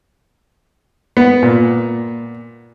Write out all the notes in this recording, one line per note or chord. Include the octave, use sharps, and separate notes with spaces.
B3
A#2